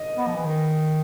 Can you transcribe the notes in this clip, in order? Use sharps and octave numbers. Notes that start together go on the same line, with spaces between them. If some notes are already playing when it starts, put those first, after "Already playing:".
Already playing: D#5
B3
F3
E3
D#3